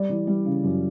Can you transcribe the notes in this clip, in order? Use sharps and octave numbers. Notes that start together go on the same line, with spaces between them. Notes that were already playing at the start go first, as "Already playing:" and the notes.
Already playing: G3 D5
E3
G3
C#3
F#2